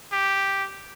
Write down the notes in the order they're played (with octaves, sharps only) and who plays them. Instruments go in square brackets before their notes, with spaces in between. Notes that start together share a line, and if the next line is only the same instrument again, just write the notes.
[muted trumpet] G4